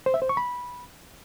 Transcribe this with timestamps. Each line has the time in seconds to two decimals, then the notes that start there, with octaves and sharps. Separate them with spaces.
0.06 C5
0.14 E5
0.22 C5
0.29 C#6
0.37 B5